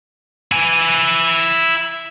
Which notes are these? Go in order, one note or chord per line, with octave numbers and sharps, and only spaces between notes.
E4 G#5